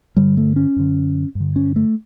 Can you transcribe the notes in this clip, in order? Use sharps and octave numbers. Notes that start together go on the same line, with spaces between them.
G2 D3 G3
A3
C#4
F#2 D3
G2
D3
C#4
A3